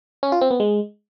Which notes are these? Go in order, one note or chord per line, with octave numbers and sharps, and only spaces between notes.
C#4
F4
C4
B3
G#3